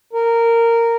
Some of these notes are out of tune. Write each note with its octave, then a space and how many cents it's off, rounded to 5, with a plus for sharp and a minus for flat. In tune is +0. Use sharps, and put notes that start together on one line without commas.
A#4 -10